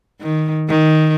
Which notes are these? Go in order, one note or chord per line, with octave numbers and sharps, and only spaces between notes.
D#3
D#3